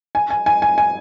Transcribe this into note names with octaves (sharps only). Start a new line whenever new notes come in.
G#5
G#5
G#5
G#5
G#5